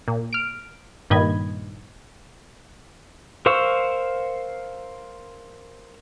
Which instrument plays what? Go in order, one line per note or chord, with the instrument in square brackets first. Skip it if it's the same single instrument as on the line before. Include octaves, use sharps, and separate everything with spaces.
[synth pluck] A#2
F6 D7
G2 A#2 D#3 D#5 B5 G#6
[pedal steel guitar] A#4 C5 F5 C#6 E6